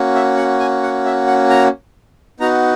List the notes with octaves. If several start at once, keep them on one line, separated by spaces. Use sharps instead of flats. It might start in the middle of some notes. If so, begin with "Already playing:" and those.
Already playing: A#3 C#4 F#4
E5
F#5
G#5
F#5
E5
F#5
A#5
B3 D#4 F#4 A#5